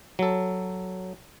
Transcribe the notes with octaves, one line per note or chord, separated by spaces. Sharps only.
F#3 A4